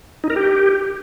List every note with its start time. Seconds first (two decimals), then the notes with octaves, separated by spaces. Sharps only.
0.24 D#4
0.30 A#4
0.36 G4